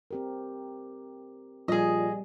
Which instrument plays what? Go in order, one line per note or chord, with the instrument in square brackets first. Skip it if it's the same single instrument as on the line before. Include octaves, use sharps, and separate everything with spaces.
[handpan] C4 G4 A#4
[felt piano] A#2 F3 [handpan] G3 [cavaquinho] G#4 D#5